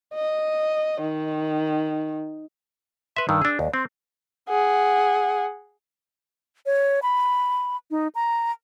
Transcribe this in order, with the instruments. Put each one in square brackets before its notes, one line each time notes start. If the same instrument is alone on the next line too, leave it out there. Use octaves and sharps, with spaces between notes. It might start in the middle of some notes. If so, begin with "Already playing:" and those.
[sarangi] D#5
D#3
[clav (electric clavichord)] B4 E5 [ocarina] C6
[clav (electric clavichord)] G2 D#3 [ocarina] E6
[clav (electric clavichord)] D4 G#4
[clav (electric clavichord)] D#2 [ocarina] D5
[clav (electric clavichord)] C4 [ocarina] C6
[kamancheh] G#4 F#5
[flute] C#5
B5
D#4
A#5